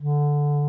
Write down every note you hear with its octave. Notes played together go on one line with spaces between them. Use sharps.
D3